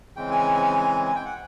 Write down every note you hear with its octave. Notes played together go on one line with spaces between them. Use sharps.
C#3 E3 G#3 C4 G5
G#5
G#5
G5
F#5